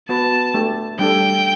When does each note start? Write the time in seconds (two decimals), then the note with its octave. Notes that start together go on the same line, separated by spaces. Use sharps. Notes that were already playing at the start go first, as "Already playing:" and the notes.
0.08 B3 F#4 B4 A5
0.54 A3 D4 G4
0.99 G3 D4 A4 G5